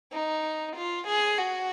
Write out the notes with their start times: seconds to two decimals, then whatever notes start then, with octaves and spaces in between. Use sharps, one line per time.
0.13 D#4
0.76 F4
1.07 G#4
1.38 F#4